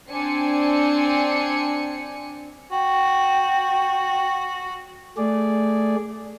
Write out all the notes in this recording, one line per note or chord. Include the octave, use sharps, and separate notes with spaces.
C4 D4 G#5 C#7
F#4 G5
A3 G#4 D5